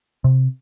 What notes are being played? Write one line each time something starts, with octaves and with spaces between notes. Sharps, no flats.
C3